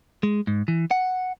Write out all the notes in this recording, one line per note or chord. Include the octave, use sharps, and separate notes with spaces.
G#3
G#2
E3
F#5